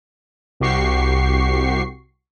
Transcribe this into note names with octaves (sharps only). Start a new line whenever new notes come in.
C2 F#4 G4 C#6 C7